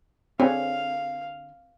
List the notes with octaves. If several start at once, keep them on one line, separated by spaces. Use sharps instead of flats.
D3 C4 G#4 C#5 F5